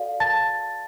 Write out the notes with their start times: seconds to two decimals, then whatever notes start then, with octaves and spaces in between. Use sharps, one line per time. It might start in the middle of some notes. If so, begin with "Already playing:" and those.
Already playing: F#4 A4 D5 F5
0.20 A5 A6